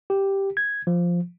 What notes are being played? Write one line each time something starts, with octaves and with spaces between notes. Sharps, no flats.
G4
G#6
F3